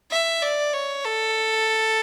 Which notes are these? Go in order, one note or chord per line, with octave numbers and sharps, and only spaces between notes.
E5
D5
C#5
A4